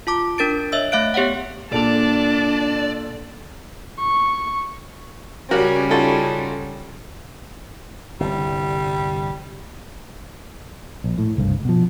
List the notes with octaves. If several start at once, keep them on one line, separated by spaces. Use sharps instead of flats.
F4 A5 D6
D4 A#4 A6 D7
C#5 D#5 E5 E6
A3 E5 F5 F#6 D7
B3 G4 C#5 F5 F#5
A#2 D4 A4 D5 A5 F7
C#6
C#3 G3 C#4 F#4 G4 A#4
D#4 F4 F#4 A4
G1 C2 G3
A#1
A2
F#1 C2 G2
B2 F3